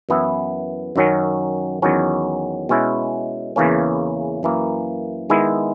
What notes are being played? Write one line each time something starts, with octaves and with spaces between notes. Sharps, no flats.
F#2 E3 B3 E4
F#2 D#3 F#3 C#4
E2 D#3 F#3 C#4
B2 G#3 C#4 E4
E2 C#3 E3 A#3 C#4
F#2 E3 A#3
D#3 G#3 B3 E4